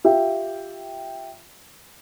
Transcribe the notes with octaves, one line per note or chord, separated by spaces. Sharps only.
F4 G4 E5 G5